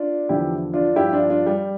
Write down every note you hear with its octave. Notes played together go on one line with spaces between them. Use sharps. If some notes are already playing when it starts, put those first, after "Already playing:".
Already playing: D4 F4
E2 D3 F3 E4 G4
D4 F4
G2 F3 E4 G4
D4 F4
D4 F4
G3